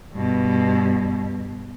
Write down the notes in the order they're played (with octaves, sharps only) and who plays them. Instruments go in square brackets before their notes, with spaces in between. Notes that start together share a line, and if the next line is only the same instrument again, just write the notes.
[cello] G2 B2